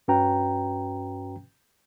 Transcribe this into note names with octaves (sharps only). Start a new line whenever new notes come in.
G2 C#4 F#4 B4 G5 A#5